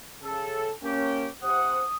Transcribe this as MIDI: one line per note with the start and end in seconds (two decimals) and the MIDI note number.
0.23 0.71 49
0.23 0.71 69
0.83 1.28 58
0.83 1.28 61
0.83 1.28 67
1.43 1.82 48
1.43 1.82 72
1.43 1.82 78
1.43 1.96 87